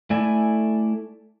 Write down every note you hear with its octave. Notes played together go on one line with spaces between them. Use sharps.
A3 E4 D5 G#5